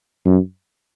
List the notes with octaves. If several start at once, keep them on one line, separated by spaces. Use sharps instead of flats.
F#2